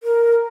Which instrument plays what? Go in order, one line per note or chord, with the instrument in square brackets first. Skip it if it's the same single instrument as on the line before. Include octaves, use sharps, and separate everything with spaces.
[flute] A#4